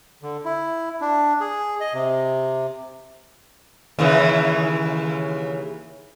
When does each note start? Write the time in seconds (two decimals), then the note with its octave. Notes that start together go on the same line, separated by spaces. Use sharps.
0.22 D3
0.45 E4
1.01 D4
1.40 G#4
1.81 D#5
1.94 C3
3.99 D#2 C#3 E3